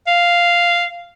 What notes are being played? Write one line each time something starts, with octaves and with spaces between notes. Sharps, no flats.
F5